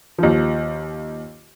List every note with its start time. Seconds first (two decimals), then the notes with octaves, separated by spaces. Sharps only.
0.18 D#2 F3